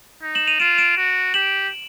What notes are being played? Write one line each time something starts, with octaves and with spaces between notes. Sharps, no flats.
D#4
E7 F#7
D#7 F7
F4 D7 E7
D7 E7
F#4
G4 E7 F#7